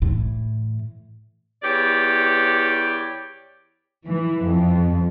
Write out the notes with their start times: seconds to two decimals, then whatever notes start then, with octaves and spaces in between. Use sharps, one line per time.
0.02 A2 E3
1.62 E2 G4 C#5 D5
4.07 E3
4.46 F2